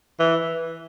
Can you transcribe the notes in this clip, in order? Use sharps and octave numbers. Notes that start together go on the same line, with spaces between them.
E3